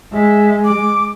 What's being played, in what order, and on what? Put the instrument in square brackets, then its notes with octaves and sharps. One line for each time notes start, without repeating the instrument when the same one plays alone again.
[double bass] G#3 [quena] E5
[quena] D6